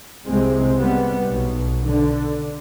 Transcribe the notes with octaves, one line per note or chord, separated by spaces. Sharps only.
C2 C3 G#3 C4
G3 B3
B1 B2
D3